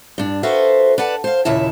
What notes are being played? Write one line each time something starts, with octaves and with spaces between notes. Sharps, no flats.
G2 D4
F#4 A4 B4 C5 E5 F5
B4 D5 F#5 A5
C5 F5
D#2 A#2 C#3 E4 E5 A5